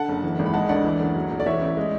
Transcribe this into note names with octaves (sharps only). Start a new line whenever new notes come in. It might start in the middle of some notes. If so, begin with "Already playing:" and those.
Already playing: D3 F#5 A5
F#1
E3
G#1
B5
G#3 F#5 A5
D2 D5 F#5
E3
F#1
F#3
B1
D5
E3 C#5 E5
A1
G#3